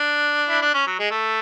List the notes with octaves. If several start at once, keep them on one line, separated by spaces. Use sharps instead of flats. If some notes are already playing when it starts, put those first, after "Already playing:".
Already playing: D4
E4
D4
C#4
F#3
G#3
A3